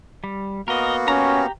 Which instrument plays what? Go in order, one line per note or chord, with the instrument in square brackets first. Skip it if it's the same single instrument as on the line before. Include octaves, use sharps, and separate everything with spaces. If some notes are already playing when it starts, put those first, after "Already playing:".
[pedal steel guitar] G3
[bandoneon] A#3 B3 F#4 [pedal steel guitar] A#4 D#5
[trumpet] C#4 [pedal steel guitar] G4 A#5